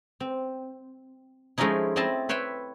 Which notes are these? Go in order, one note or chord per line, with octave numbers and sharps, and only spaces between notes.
C4
F3 G#3 A3 C#4 D#4 E4
C4 E4 D#5 A5 C6
B4 C#5 E5 G5 C6